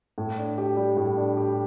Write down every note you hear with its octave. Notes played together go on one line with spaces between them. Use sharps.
A2
D4
G4
G3
A2
D4
G4